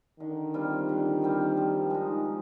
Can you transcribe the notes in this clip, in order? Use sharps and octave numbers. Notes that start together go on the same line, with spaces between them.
D3 D#3
G3 C4 F4
D3
G3 C4 F4
F3
G#3 D#4
F3